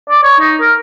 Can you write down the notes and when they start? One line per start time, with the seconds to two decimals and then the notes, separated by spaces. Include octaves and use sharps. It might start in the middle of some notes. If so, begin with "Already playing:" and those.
0.10 D5
0.23 C#5
0.40 D#4
0.61 A#4